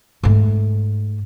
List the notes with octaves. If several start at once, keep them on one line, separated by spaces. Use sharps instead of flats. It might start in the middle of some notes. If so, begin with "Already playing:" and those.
G#2 A3